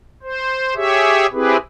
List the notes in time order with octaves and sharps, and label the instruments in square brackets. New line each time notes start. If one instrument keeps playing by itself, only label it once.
[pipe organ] C5
G4 G#4 C#5 E5
C4 E4 G4 G#4 B4